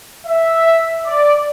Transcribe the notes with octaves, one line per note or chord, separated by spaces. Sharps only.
E5
D5